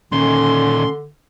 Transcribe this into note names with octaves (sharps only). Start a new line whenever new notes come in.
A#2 D3 D#3 C#4 C6